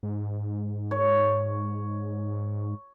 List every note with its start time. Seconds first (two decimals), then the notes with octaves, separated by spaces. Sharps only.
0.03 G#2
0.91 C#5